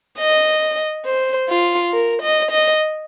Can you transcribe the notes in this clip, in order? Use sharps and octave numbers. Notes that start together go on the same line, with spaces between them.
D#5
C5
F4
A#4
D#5
D#5